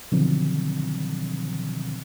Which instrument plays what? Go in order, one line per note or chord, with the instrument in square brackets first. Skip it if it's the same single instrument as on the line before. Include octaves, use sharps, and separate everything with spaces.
[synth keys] B2 D3 D#3 F3 F#3 C4